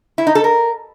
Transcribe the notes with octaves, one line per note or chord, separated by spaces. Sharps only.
E4
D#4
A4
A#4